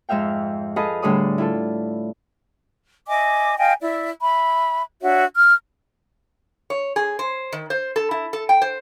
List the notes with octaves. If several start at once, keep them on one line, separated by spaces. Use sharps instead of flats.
F2 G#2 E5 F5 G5
G#4 A4 B4 D#5 F5
A2 D3 G3 G#4 D5 D#6
E4 F4 A4
D#5 E5 G#5 D6
D#5 F5 G5 G#5
E4 D5 E5
E5 B5
D4 F#4 C#5 E5
F6
C#5
G#4
C5
D#3
C5
A4
E4
A4
G5
C5